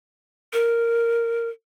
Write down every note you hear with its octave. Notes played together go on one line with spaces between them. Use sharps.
A#4